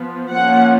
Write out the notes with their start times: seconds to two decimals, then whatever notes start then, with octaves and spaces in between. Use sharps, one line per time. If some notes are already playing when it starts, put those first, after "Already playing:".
Already playing: F3 B3
0.32 F3 A#3 C#4 F#5